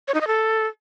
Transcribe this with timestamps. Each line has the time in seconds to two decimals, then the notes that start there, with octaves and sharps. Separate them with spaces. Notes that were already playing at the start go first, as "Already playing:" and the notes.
0.08 C#5
0.14 D#4
0.21 D#5
0.27 A4